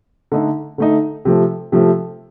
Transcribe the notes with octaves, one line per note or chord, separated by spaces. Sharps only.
D3 A3 D#4
D3 A3 D#4
C3 F3 A3
C3 F3 A3